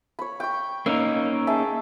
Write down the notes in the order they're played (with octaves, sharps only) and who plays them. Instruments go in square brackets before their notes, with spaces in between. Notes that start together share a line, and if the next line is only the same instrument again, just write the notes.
[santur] C#5 B5
G5 C#6
[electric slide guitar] A#3 C#4 D#4 [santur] E6
[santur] G#4 E5 A5